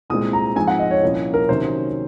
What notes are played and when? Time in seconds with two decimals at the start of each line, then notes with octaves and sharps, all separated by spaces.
0.10 C2 A#2 G#3 C4 D#6
0.33 A#5
0.56 G#2 F3 G#3 C4 G#5
0.67 F#5
0.79 D#5
0.91 C#5
1.03 C2 A#2 F3 A#3 C#4
1.34 A#4
1.49 C3 D#3 F#3 C#4 C5